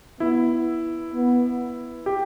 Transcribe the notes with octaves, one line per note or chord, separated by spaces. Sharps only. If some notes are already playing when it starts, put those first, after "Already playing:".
B3 E4
B3
G4